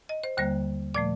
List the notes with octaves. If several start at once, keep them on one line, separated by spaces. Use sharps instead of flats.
D#5
C5
D#2 D3 G3 A#3 C5
A#2 F3 A3 D5